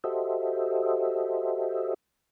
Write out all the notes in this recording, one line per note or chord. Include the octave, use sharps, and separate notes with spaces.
F#4 G4 A4 C5 D#5 E5